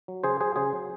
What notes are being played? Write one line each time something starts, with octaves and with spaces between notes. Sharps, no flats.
F#3
C#3 G#4 C5
F#3 G#4 C5
C#3 G#4 C5
F#3